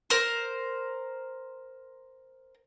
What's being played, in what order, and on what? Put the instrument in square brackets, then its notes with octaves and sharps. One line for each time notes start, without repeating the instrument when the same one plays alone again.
[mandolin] A#4 C5